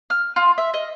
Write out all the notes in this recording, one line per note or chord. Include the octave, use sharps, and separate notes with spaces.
F6
F4
E5
D#5